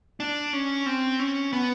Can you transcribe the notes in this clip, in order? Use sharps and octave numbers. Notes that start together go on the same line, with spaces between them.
D4
C#4
C4
C#4
B3